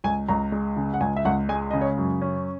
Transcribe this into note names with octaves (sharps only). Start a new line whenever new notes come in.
C#2 G#5
C#2 A#5
G#3
C#3
F#5
C#2 G#5
E5
C#2 F#5
G#3 G#5
C#3 D#5
C#5
F#2
C#4